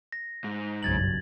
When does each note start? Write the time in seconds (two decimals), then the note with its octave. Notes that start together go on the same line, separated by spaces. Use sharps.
0.12 A#6
0.44 G#2
0.83 F#1 B1 G2 G#6 A6 F#7